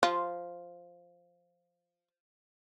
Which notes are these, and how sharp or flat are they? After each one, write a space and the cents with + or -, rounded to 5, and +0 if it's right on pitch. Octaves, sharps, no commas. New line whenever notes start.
F3 +0 F4 +0